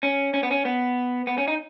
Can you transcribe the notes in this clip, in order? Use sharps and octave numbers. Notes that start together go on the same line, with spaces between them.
C#4
C#4
B3
C#4
B3
B3
C#4
D#4